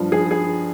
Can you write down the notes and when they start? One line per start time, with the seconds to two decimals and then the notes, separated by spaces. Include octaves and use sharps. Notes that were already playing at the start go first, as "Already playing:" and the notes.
Already playing: G2 F3
0.12 G#4
0.31 G#4